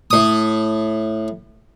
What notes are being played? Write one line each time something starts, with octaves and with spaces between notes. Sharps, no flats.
A2 D#6